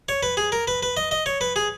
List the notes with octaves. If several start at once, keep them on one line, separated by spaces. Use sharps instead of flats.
C#5
B4
G#4
A#4
B4
B4
D#5
D#5
C#5
B4
G#4